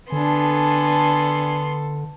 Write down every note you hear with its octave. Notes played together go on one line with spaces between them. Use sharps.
D3 B3 D4 A4 G#5 C6